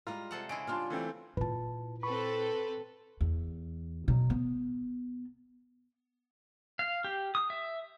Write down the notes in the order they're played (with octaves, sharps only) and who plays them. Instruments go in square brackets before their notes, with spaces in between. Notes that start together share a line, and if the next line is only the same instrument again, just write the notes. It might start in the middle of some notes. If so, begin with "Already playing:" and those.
[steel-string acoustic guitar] G3 G#3 A#5 [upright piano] F4
[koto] C3 A4 F#5
[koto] C#3 G#3 E4 [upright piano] D7
[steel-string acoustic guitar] G3 D4 F4 [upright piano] A5 C6 F6
[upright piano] E3 A3 C4
[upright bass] A#2 E4 [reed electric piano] B4 A5
[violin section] C4 A4 B4 [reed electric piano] B5 C#6
[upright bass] E2
B2 F#3
B3
[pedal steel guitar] F5
G4
D#6
E5